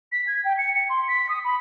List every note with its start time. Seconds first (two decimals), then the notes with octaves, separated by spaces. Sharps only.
0.12 B6
0.27 G#6
0.45 G5
0.58 C#7
0.75 C#7
0.90 C6
1.08 B6
1.29 D#6
1.45 B5